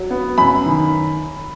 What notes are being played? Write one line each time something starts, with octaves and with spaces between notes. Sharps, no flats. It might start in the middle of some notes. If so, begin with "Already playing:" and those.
Already playing: F#3
B3
F#2 B5
D#3